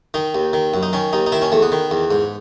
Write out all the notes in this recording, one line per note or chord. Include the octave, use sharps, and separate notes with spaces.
D#3 D#4
D#2
D#3
F#2
D#4
D#3 C#4
D#2 D#4
D#4
D#3 E4
C#4
E2 A3
B3
D#3
E2
G#2